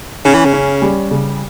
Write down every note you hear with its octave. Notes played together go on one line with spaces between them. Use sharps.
C#3 C#4
E3
C#3
C#4
G3
C#3